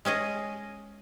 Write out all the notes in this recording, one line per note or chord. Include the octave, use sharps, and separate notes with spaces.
G#3 C#4 G#4 D#5